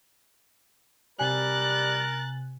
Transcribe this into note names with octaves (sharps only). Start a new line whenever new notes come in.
C3 G3 A#4 G#5 F#6 A6